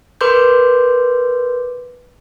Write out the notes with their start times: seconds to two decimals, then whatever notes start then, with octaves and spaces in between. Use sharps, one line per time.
0.21 A#4 B4 C6 D6 G6